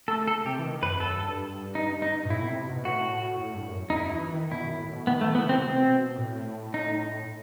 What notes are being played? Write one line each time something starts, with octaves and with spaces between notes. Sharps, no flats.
A3 A4
A4
C3 G4
E3
D#3
F#2 B4
F#2 A4
G2
D#4
D#4
B2
A2 E4
B2
C3
B2
A2 F#4
A2
G2
F#2
E2 D#4
F#2 E4
E3
D#3
B2 E4
F#2
A2
B2
D#3 B3
A3
E3
B3
C3 C4
B2 C4
A2
D#4